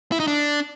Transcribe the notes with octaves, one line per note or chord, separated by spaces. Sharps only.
E4
D#4
D4